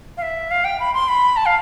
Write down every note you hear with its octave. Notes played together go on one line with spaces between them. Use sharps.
F5
E5
F5
G5
B5
C6
B5
A5
F5